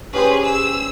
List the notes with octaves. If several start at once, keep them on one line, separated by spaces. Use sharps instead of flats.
C#4 G4 G#4 B4 C5
E6